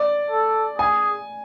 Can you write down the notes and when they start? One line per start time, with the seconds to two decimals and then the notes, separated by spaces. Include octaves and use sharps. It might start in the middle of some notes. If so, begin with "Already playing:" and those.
Already playing: D5
0.31 A4
0.79 G#4 G#5